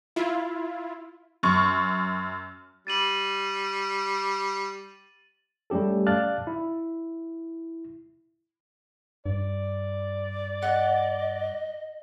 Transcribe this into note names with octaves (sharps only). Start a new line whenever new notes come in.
E4 F4
F#2 C#6
G3 A6 D#7 F#7
G3 A3 C#4 G4 A4
D5 F5 A5 F6 F#6 A6
E4
G2 D5
D#5 F#5